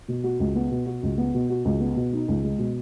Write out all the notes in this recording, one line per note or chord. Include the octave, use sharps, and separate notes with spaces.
B2
F#4
C#2
B3
B2
F#4
C#2
B3
B2
F#4
C#2
B3
B2
D#4
C#2
G#3
B2